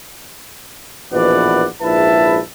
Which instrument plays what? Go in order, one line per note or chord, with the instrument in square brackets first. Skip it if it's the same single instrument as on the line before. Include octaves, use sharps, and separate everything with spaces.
[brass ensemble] A#1 B2 E3 B4 D5 F#5
A#1 G#2 E4 B4 E5 A5